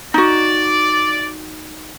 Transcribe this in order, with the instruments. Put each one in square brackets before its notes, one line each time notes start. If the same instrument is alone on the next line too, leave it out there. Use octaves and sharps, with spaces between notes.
[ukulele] D#4 F#4 [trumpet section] D5